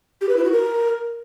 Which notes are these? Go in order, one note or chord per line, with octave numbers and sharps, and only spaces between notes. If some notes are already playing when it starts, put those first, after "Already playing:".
G4
B4
E4
F#4
A#4